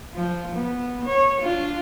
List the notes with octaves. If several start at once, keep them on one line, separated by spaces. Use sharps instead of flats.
F3
B3
C#5
D4 F4